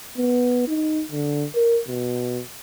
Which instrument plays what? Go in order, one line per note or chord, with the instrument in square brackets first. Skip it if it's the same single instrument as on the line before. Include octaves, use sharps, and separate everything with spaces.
[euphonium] B3
D#4
D3
A#4
B2